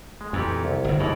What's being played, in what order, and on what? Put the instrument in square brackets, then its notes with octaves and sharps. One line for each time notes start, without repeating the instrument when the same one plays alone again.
[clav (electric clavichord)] G#3
[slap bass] F2 [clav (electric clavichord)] A#2 E3 G4
[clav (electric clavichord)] C2
[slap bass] G1 F#2
[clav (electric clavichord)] C#2 B2 E3 [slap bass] G2 D#3